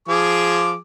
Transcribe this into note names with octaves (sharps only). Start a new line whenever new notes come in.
F3 G#4 D6